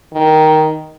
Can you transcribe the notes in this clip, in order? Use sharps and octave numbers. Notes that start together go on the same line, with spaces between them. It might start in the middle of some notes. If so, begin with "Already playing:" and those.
D#3